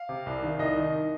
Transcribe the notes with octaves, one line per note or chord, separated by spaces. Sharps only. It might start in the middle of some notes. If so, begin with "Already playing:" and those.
Already playing: F5
C3
C2
D#3
C2 D#5
D#3